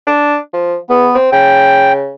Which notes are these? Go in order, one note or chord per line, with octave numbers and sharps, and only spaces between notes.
D4
F3
E2 B3
C4
C#3 G5